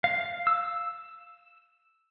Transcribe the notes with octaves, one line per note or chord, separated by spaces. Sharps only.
F5
E6